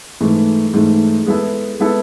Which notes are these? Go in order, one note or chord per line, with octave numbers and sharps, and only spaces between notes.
G#2 E3 A3
G#2 E3 A3
G#3 B3 E4 A4
G#3 B3 E4 A4